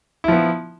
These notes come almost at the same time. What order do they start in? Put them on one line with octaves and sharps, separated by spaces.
E4 F3 B3